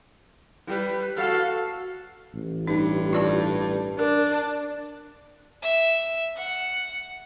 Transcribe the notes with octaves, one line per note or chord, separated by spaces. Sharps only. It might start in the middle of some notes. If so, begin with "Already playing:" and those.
G3 B4
F#4 A4 F5
A1
G2 D#4
F4 D5 A5
D4 A#4
E5
F#5